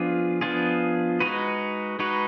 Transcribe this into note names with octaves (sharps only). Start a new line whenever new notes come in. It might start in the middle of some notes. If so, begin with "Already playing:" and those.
Already playing: F3 B3 D4 F4 G#4
F3 B3 D4 F4 G#4
G#3 D#4 F#4 B4
G#3 D#4 F#4 B4